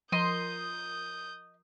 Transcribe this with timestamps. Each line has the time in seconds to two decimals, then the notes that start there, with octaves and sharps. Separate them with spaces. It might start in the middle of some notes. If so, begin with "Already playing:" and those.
0.12 F3 A#4 D#5 C6 D#6 G6